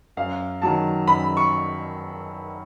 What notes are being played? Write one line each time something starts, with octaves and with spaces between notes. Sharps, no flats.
F#2 F5
D#3 F#3 A5
F#2 B5
C#6